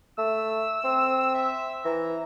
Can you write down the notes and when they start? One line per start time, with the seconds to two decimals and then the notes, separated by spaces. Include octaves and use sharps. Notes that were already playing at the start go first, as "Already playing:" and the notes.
0.18 A3 E6
0.84 C4
1.34 E5
1.85 E3 A#5